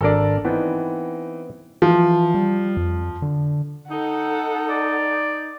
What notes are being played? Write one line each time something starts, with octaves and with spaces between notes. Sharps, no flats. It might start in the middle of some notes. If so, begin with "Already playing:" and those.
G#1 D4 A4 A#4 D5
E3 B3 C4 D#4
E3 F3
G3
F2
D3
D#4 A4 F#5
D5